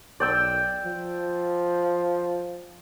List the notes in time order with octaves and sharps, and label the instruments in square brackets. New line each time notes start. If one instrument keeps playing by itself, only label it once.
[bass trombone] B1 [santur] D5 G5 E6
[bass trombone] F3